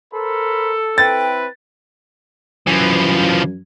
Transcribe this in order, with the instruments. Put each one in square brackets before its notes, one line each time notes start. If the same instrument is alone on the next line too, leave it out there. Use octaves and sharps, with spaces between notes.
[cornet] A4 [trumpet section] A#4 C5 B5
[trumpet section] C4 E4 B4 [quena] G5 [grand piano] A6
[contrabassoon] F#2 [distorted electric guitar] E3 F3